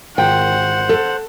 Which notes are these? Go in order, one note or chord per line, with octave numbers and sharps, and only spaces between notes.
G#1 F4 A#4 C5 F#5 G5
A4